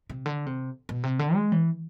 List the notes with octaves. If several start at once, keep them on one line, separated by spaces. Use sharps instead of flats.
C3
D3
C3
B2
C3
D3
G#3
E3